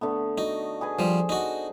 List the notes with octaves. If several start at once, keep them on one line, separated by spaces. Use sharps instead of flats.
D3 A3 B3
D#4 F#4
G#4 B4 G#5
F3 G3 C5
D#4 F#4